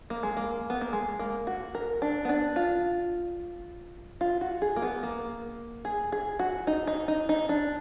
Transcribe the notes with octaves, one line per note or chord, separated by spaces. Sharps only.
A#3
G#3
A#3
B3
A#3
G#3
A#3
F#4
A#4
D4
B3
D4
F4
F4
F#4
G#4
A#3
B3
A#3
G#4
G#4
F#4
D#4
D#4
D#4
D#4
D4